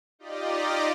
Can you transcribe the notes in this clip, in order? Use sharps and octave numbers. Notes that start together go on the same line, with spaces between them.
D#4 F4 G4 D5 D#5